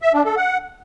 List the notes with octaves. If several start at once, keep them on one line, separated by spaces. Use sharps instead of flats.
E5
D4
A4
F#5